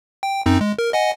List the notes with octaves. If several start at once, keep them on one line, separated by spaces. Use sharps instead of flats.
G5
F#2 C4 D#4
G#3
A#4
D#5 F#5 G#5